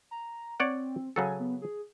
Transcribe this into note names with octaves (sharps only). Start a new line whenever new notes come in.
A#5
C4 C#5 D5 F#5
C#3 F#3 A4 G#5
B3
G#4